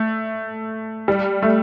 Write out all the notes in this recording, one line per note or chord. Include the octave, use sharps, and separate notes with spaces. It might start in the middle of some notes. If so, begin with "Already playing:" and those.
Already playing: A3
G3
A3